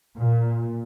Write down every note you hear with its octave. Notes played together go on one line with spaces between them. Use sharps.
A#2